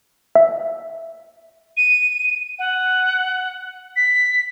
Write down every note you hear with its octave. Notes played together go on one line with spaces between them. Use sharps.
E5
D#7
F#5
B6